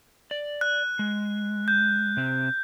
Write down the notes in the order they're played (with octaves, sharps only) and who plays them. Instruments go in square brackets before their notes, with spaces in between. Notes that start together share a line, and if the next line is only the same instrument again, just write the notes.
[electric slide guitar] D5
[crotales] F#6
[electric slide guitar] G#3
[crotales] G6
[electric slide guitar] C3 C4